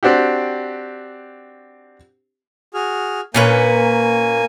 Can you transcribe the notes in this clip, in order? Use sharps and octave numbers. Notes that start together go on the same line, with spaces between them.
C4 D4 F#4 G4
F#4 G#4 F6
A#2 A#3 C#4 B4 G#5